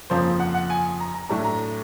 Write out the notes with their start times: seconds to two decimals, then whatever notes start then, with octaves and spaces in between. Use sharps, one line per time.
0.10 F2 C#3 F3 A#3 C5
0.40 F#5
0.54 F#5
0.70 G#5
1.00 A#5
1.14 A#5
1.29 A2 F#3 A3 D4 A#5
1.45 A#5